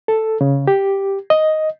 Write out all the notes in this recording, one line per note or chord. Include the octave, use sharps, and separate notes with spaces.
A4
C#3
G4
D#5